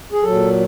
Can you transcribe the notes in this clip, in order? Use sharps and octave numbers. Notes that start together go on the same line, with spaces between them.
G#4
A#2 F#3 A4